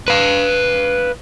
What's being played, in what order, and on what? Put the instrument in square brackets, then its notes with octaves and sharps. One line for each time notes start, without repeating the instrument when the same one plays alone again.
[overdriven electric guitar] B4 F5